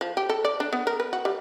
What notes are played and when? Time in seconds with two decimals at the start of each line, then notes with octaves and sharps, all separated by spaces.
0.01 F3
0.17 G4
0.29 A4
0.45 D5
0.60 D4
0.73 B3
0.87 A#4
1.00 B4
1.13 F#4
1.25 G3